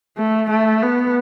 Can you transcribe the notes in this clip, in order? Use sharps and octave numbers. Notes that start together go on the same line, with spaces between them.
A3
A3
B3